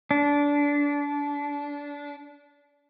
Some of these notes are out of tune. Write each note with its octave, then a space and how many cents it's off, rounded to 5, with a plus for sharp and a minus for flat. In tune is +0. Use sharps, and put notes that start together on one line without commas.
D4 -25